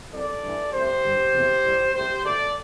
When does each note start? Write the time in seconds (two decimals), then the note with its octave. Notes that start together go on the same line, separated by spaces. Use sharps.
0.12 C2 C3 G3 A4 D5
0.43 G2 E3 A3
0.73 C2 C3 A3 G4 C5
1.03 G2 D3 G3
1.34 E2 C3 E3 A3
1.64 A2 G3
1.94 C2 C3 A3 G4 C5
2.24 D2 D3 A3 A4 D5